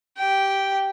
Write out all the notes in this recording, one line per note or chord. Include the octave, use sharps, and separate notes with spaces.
G4 G5